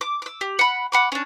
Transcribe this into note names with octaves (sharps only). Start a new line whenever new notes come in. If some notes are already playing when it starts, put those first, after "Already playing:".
D6
D6 E6
G4
F#5 B5
F#5 B5 D6
C#4 D4